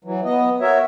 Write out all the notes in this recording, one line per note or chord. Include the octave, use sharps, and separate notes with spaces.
E3 F#3
B3 D#5
F#4 A#4 C#5 E5